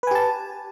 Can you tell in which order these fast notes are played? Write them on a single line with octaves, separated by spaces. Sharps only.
B4 G#5 G4 A5